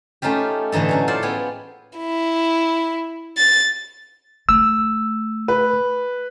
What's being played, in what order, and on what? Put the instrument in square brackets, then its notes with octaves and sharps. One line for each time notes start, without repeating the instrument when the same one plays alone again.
[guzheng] A3 C#4 D#4 F4 G4
A2 D3 E3 D#4 A4
F#3 C#4 F#4
F4 A4 C5 D5
B3 G#4 C#5 G5
[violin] E4
A6
[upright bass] A3 [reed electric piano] E6
[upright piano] B4